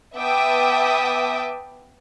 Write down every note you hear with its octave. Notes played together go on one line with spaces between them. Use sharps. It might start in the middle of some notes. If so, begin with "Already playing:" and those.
B3 E5 G5 A5 D6 D#6